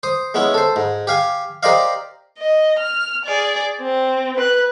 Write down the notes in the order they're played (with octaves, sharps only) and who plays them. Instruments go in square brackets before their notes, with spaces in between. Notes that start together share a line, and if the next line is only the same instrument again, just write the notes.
[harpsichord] C5 D#6
G#3 B3 C#4 E4
A4 C5
G#2
G4 F5 G#5
G4 A#4 C5 D5 D#5 F5
[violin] D#5
F6
G#4 D5
C4
B4 F#6